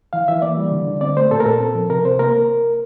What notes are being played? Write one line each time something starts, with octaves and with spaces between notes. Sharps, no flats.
E3 F5
E3 E5
A#3 D5
G3
D3
D3
C4 D5
A3 C5
A#2 A4
A#4
A#2 A4
C4
F3
C3 A#4
C3 C5
A#3 A#4